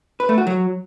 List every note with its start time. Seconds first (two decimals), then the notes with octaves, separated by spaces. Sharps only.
0.20 B4
0.29 A3
0.38 F#4
0.47 F#3